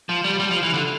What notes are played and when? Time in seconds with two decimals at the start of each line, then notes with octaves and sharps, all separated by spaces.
0.09 F3
0.24 G3
0.39 G3
0.51 F3
0.63 E3
0.74 D3